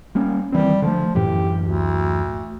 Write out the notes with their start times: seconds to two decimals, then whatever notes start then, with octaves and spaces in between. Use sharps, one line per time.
0.15 G3 A#3 C#4
0.52 D#3 E3 G3 C4
0.82 D3 F3 A3
1.15 F#2 A2 E3 G4
1.62 D2